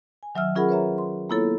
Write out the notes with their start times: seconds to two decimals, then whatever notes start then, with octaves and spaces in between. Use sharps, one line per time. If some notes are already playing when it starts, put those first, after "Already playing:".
0.23 G#5
0.35 D#3 F#3 E5 E6 F6
0.55 C#4 F4 G#4 A#4 F#5 B5
0.69 B4 C#5 E5 A#5
0.98 C6
1.30 A#3 B3 E4 F4 A4 C#5